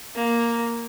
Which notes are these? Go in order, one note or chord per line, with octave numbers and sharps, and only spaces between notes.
A#3